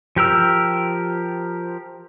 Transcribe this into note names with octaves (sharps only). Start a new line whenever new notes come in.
F3 G4 A#4 E6